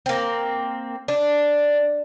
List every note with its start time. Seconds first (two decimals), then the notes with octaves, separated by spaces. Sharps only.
0.06 A#3 C4
1.08 D4